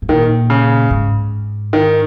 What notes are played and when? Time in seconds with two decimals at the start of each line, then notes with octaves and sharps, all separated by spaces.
0.02 G#2
0.09 A#2 D#3
0.50 C#3
0.91 G#2
1.73 D#3